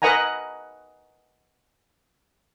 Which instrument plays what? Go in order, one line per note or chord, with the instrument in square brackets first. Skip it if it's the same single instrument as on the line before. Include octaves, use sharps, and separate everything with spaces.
[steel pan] A#4 B4 D#5 F#5 G#5 A#5